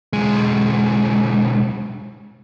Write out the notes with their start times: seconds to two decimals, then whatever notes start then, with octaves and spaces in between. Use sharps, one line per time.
0.13 B1 G#3